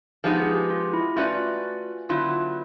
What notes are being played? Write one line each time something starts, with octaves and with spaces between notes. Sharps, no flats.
F3 G#3 B3 D#4 G4
G#4
G4
F4
E4
A3 C#4 F4 F#4 B4 D5
D3 F#3 B3 E4 F4